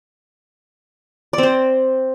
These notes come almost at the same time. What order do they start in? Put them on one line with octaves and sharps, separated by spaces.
D5 C4 C5